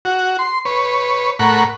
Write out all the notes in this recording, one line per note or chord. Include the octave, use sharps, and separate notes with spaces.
F#4
C6
B4 C#5
A2 A#4 F#5 B5 C#6